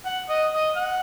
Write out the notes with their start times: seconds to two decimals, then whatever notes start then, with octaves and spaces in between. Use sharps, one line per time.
0.06 F#5
0.29 D#5
0.53 D#5
0.76 F#5